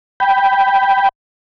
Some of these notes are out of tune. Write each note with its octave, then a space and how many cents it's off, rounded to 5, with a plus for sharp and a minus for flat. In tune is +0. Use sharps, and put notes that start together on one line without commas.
G5 +0 B5 +0